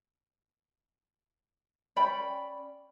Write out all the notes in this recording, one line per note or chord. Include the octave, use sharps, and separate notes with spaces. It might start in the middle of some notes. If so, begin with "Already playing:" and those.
C#4 D5 G5 B5